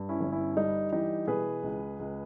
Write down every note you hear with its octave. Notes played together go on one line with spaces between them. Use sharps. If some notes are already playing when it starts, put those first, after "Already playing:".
Already playing: G2
C#4 E4
G1
C#4 E4
G3 D#4
E3 D#4 G4
B2 G#4 B4
C#2
C#2